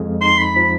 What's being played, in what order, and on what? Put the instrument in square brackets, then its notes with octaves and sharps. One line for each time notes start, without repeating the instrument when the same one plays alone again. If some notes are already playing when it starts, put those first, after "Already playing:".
Already playing: [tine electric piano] F2 G#3
[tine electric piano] D#4 [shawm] C6
[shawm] B5
[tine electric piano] F3 [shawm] B5